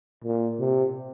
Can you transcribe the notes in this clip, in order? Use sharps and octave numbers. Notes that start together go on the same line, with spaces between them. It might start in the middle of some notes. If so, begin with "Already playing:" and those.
A#2
C3